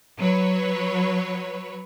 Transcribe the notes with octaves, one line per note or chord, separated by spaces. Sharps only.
F#3 B4 C#5